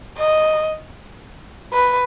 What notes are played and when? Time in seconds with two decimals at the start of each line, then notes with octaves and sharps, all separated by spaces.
0.18 D#5
1.73 B4